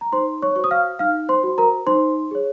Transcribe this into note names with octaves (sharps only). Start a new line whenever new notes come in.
A#5
D#4 C5 C6
C#5 C#6
F#4 C5 C#6
D#6
F5 F6
D#4 F5 F6
C5 C6
F#4 C5
A#4 A#5
D#4 C5 C6
G#4 C#5